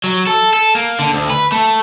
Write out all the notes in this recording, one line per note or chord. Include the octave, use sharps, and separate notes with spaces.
F#3
A4
A4
A#3
D3
D2
B4
A3